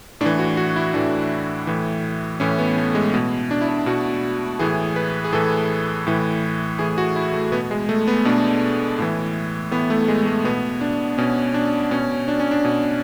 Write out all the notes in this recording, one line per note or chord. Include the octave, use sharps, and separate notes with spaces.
A2 D4
E3
F#4
F#4
E4
A2 E3 D4
A2 E3
A2 E3 C#4
B3
A3
G#3
B2
D4
E4
D4
B2 F#4
A2 E3 G#4
B4
G#4
A2 E3 A4
A2 E3
A2 E3 G#4
F#4
E4
A3
B2 B3
G#3
A3
B3
B2 D4
A2 E3
A2 E3 B3
A3
G#3
A3
B2 B3
D4
B2 C#4
D4
B2 C#4
D4
C#4
D4
B2